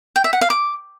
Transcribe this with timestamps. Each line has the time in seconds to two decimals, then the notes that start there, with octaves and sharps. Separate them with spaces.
0.16 G5
0.24 E5
0.33 F#5
0.41 F5
0.50 D6